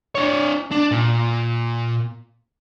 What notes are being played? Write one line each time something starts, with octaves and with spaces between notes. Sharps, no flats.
D4 C#5
D4
A#2